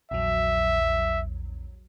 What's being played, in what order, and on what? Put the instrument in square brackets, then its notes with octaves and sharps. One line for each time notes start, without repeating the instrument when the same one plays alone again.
[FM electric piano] A#1 E2 F#3 [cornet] E5